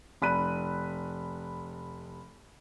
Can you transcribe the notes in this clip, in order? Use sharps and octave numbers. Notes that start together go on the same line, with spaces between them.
F1 B5 F#6 D#7